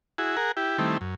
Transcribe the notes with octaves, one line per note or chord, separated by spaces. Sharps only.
E4 F#4 G#4
G#4 A#4 F#5
E4 G4
D#3 G3 A3 C4 E4
F#2